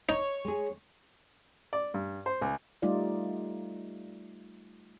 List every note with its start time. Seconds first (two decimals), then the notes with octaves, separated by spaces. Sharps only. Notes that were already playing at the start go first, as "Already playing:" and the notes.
0.09 D#4 C#5
0.45 G#3 G#4
1.73 D5
1.94 G2
2.26 C5
2.41 C#2
2.82 G3 A3 D#4 F4 D5